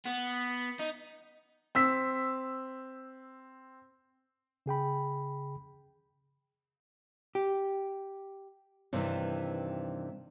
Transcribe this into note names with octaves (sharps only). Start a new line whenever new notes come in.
B3
D#4
C4 E6 B6
C#3 G#4 G5 B5
G4
G2 C3 D#3 E3 G3